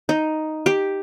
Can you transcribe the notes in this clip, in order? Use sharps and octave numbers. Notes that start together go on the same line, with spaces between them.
D#4
G4